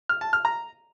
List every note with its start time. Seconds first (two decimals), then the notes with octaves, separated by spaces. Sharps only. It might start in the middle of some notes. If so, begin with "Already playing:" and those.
0.09 F6
0.21 A5
0.33 F6
0.45 A#5